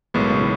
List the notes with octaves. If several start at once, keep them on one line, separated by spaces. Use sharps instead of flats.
B1 A2 D#3 G#3 B3
C#3
E3